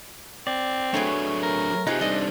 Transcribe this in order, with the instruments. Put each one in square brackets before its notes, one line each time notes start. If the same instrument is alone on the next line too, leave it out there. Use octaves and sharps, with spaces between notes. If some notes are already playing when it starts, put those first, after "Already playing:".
[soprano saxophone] C4 [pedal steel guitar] D5
[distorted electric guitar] F#3 D4 [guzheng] A3 B3 G#4 [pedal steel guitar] C#5
[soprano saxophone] A#4
[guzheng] C3 G#4 F#5 [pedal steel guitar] D#4 [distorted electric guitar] F4 G4
[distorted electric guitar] G3 D#4 [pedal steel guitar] D4 [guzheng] A4 [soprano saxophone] D#5